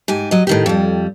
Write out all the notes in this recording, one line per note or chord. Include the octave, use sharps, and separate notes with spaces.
G#2 G4 G#5
F#3 D#5
A2 D#3 G4
F2 G3